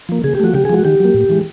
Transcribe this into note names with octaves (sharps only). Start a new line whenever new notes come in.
F3 A#3
C#3 G#4
G4
F3 A3 F#4
C#3 G4
G#4
F3 G#3 F#4
D#3 G4
F#3 A#3
A2
E3 G#3